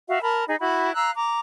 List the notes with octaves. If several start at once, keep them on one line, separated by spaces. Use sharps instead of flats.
F#4 E5 F5
A#4 A5 B5
D#4 G#4
E4 F#4 B5
F5 A#5 E6 F#6
A#5 D6